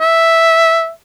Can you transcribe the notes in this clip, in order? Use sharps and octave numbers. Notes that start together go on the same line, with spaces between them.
E5